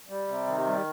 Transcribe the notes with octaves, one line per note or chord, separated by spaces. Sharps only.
G3
C3
D#3
G3